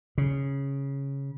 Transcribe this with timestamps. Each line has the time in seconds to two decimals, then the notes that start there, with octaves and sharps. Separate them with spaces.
0.18 C#3